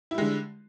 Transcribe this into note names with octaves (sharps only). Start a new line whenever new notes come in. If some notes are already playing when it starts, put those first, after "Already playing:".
D3 G3 G#3 E4